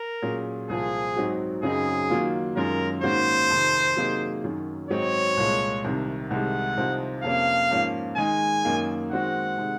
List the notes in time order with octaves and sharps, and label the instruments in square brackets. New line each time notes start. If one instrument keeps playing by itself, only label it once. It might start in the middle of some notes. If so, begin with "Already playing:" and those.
Already playing: [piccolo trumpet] A#4
[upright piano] A#2 F#3 C#4 G#4
[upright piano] C2 A#2 F3 C4 F4 [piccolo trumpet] G#4
[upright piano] G#2 F#3 C4 D#4 F#4
[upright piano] F#2 C#3 F#3 C4 D#4 [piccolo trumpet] G#4
[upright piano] D#3 F#3 A#3 F4
[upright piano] F#2 D#3 G#3 C#4 F4 [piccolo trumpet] A#4
[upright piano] G#2 D#3 A#3 C#4 F#4 [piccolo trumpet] C5
[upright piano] F2 C3 D#3
C3 F#3 A#3 D#4 G#4
F#2 D#3 F#3
[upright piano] G#2 F#3 C4 D#4 [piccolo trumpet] C#5
[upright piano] C2 A#2 G#3
C2 C3 D#3
[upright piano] C2 C3 D#3 G#3 [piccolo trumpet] F#5
[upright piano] C2 C3 F3 C4 D#4
[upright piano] F2 C3 F3 A#3 C#4 [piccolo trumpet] F5
[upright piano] G#2 F3 A#3 C#4
[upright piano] D#3 G#3 D#4 G#4 [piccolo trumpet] G#5
[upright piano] F#2 D#3 A#3 D#4
[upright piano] D#3 G#3 C4 F#4 [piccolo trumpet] F#5
[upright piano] C3 D#3 G#3